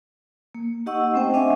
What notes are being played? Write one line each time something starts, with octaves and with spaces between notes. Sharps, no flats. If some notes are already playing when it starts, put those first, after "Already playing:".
A#3
D#4 G4 D#5 F#5 C#6 E6
A3 C4 C#4 C5 G5
D4 D#5 E5 F#5 G#5